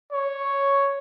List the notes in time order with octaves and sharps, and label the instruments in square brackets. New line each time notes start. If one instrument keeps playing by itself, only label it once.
[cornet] C#5